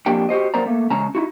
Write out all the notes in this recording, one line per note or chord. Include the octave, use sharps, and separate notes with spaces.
F2 A#3 D4 G4 G5
F#4 G4 C5 D#5
F#2 A#3 B3 C5 D5 A#5
A3 A#3
E2 C#3 G#3 C#4 A5 A#5
D#4 E4 F#4